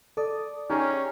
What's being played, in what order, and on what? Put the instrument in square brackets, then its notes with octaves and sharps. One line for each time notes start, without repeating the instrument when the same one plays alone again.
[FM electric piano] A4 D#6 [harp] D5
[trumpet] C#4 [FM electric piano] D#4 A#5 [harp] G4 G#4